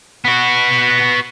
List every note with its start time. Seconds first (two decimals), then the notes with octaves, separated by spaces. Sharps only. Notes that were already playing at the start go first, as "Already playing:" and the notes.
0.25 B3 F#4